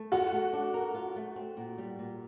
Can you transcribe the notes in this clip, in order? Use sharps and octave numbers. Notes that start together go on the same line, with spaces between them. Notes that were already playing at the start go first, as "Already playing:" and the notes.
Already playing: A3
F4 F#4 F#5
A3
D4
A#4
F4
A3
C4
A#2
G3
A#2